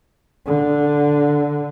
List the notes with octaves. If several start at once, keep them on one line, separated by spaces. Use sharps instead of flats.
D3